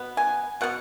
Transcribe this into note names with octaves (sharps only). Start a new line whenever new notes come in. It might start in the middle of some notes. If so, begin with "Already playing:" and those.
Already playing: B2 B3
G#5
B2 B3 F#5